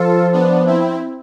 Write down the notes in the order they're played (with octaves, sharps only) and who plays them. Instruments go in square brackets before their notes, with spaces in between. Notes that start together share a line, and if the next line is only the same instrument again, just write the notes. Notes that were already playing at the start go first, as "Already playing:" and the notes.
Already playing: [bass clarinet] F3 [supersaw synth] F4 A4
[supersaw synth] B3 D4
C4 E4